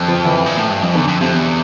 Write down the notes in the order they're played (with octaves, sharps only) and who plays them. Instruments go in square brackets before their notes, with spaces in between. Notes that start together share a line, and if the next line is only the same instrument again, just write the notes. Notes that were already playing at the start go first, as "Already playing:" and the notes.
Already playing: [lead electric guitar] F2
[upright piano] F3
E3
[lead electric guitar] A#2
A2
G2
F2
[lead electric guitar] E2 [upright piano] D3
[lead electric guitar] F2
[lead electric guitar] F2 [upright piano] C3
[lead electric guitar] E2